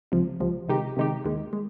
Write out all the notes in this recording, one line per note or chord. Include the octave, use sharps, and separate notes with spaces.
C#2 C3 F3
C#2 C3 F3
C3 D#3 G#3 D#4 G4
C3 D#3 G#3 D#4 G4
D#2 D#3 G#3
G#3